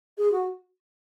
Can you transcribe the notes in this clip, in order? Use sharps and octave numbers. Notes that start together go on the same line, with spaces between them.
G#4
F#4